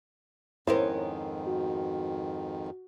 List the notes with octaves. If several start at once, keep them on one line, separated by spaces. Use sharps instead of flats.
F2 G#2 D#3 B3 C#4 E4 A#4 C5
F#4